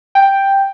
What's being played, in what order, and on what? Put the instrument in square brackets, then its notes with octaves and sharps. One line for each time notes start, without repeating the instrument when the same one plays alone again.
[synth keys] G5